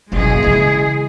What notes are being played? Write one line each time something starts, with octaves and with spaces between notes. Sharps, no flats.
F#1 B1 E3 G#3 G#4
C#3 E4